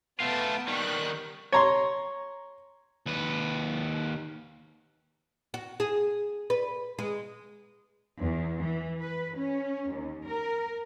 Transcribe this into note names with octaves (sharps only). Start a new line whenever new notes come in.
A3 B3 F4 A5 D7
D#3 G3 C#6 F#6
C#5 A#5 C6
D#2 B4
F#4
G#4
B4
G#3
E2
E3
B4
C#4
D#2
A#4